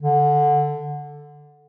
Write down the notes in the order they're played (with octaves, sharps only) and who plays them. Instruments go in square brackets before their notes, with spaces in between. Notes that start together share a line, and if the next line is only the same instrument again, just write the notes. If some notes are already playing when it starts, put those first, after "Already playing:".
[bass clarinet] D3